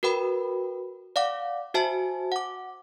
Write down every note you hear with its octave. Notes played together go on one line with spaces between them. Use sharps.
F#4 A#4 B4 G5 B5
D5 F5 F#5 D6
F#4 C5 E5 G#5 A5
F#5 D6